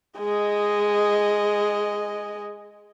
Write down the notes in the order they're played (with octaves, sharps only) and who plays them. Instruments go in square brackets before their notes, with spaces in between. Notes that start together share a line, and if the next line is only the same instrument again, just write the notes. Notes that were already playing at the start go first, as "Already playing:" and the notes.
[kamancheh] G#3 D#5